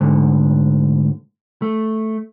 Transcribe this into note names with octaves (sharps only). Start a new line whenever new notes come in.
D2 G#2 D3
A3